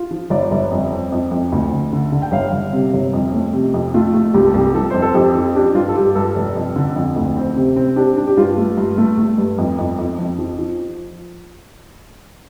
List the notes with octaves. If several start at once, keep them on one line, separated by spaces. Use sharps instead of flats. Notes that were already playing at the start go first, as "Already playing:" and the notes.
Already playing: F4
F3
G1 D5
G1
F2
C4
F2
F2
D2
D3
D3
D3
G5
G1 F5
G1
C3
G1
F2
A3
C3
F2
A3 F4
A3
C2 G4
A4
C2 G4
F3 A4
F2 C5
A4
F2 G4
F3
D4 G4
G2 F4
A4
G2 G4
G2 A4
F1
F2
D3
F2
D2
C4
C3
C4
D4 G4
D4
G4
G2 F4
A3
G2
A3
A3
G2
F2
F2
F2
F2
F3
F3